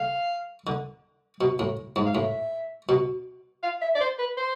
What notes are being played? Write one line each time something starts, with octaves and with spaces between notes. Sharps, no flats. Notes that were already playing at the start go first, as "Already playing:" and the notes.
Already playing: D3 F5
D3
B2
A2
G#2
F5
A2 E5
B2
F5
E5
D5
C5
B4
C5